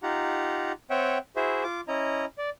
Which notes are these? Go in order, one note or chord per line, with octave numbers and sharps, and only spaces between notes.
D#4 F4 G4 F#5 A#5
C4 C#5 E5 F#5 G5
E4 F#4 G#4 C5 E5
F4 D6
C#4 E4 D#5 A#5
D5